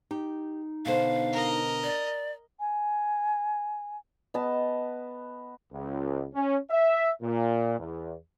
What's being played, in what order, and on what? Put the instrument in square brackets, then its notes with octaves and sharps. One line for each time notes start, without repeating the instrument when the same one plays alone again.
[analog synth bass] D#4 [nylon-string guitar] G4
[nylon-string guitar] B2 D3 C5 [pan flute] F5
[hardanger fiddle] A#4 D#5
[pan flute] D5
[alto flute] G#5
[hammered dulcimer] B3 D#5 A5
[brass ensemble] C#2
C#4
E5
A#2
E2